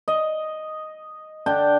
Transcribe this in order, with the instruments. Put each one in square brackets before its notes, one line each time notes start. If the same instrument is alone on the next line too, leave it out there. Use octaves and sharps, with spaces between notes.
[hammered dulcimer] D#5
D3 D4 G5